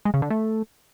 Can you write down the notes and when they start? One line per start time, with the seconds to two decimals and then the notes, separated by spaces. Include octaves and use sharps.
0.05 G#3
0.14 C#3
0.22 D3
0.30 A3